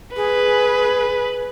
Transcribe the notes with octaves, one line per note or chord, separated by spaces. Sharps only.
G#4 B4